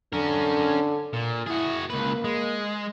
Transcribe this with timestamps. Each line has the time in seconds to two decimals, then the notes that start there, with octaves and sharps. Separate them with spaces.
0.13 D3 C#4 A#4
1.13 A#2
1.47 E4 F#4 G#4
1.90 C#2 A#3 B4
2.24 G#3